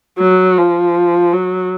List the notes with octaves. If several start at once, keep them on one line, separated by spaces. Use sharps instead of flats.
F#3
F3
F#3